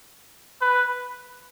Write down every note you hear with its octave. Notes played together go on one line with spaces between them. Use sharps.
B4